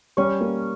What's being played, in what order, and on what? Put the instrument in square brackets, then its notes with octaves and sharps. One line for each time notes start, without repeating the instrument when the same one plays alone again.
[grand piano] G3 [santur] C#4 C#5
[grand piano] A#3